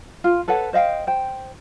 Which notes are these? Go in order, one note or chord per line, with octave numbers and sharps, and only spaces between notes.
F4
A4 B4 C#5 F#5
C5 D#5 F5 G5
C5 G5